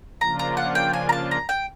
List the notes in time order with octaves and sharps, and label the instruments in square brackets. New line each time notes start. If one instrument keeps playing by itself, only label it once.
[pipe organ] C#3 F3 A#3 D4 F4 [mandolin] A#5
[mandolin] A#5
F#5
G5
G#5
A#5
A5
A#5
G5